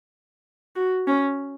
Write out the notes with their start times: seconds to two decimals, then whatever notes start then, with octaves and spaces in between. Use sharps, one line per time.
0.76 F#4
1.07 C#4